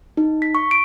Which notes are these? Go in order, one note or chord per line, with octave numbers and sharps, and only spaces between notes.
D#4
B6
C#6
D7